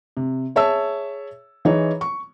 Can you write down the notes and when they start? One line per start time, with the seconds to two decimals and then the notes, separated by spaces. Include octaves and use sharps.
0.17 C3
0.56 G#4 C#5 E5 A5 E6
1.65 E3 D#4 G#4 C#5
2.01 C#6